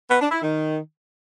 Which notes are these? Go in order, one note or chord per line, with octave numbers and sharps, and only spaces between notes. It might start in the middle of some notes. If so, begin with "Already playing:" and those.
B3
D4
E4
D#3